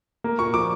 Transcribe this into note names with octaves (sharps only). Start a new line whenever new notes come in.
A#3
A#2 C#6
F3 D6